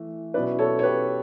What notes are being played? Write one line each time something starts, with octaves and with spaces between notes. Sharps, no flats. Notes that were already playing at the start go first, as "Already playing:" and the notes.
Already playing: E3 A3
B2 F#3 C#4 E4 B4 D5
A4 C#5
C#5
G4 B4